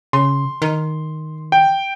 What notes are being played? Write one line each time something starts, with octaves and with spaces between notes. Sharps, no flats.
C#3 C6
D#3
G5